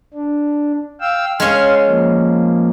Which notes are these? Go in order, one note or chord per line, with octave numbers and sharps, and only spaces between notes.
D4
F5 G5 E6
G#3 C#4 F5 C6
F3 A#3